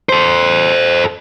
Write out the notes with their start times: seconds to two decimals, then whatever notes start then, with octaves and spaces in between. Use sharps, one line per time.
0.09 A4 C5